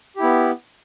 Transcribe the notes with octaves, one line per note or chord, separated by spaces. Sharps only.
B3 E4 G4